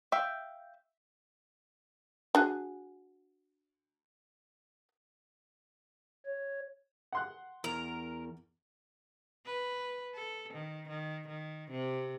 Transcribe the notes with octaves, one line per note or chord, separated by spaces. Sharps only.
E5 F5 G5
D4 F#4 G#4
C#5
F#5 C6 F#6
E2 A#4
B4
A4
D#3
D#3
D#3
C3